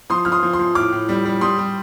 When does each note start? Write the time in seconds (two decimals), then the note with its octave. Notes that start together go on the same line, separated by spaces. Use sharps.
0.10 F3 C6 D#6
0.25 F3 F6
0.32 C6 D#6
0.43 F3
0.53 C6 D#6
0.59 F3
0.75 A2 D6 F6
0.92 A2
1.09 G3
1.25 G3
1.41 G3 C6 D#6
1.58 G3